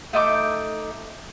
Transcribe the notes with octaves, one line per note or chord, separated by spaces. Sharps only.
A3 D#4 D6